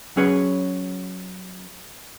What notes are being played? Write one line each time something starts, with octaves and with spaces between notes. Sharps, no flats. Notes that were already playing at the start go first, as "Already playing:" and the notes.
F#3 C#4 G#4 B4 C#5